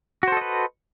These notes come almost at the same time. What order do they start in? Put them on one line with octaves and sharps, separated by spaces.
F#4 C5 A4 D#5 B4